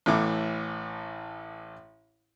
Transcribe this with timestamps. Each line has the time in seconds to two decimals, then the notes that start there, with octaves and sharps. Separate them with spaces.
0.06 A1 A2 E3 D6